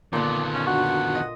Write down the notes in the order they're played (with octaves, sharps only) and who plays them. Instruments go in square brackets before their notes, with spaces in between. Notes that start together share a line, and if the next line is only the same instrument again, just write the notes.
[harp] A#2 D3 [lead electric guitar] D#3 B3 [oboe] D5
[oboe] C#4
[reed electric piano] D4 F#4 C#6 [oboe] F#5
[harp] D#5